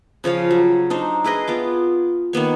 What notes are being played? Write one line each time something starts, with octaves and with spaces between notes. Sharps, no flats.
C#3 F3 C#5 F5
F#3
D4 D#4 C5
E4 G#4 B4 D#5
B3 F4 D6
D#3 A#3 B3 C#5